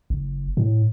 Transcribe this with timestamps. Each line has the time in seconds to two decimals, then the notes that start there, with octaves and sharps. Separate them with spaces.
0.10 F#1
0.57 A2